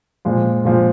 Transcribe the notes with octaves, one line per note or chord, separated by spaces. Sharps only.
A#2 F3 G#3
A#2 F3 G#3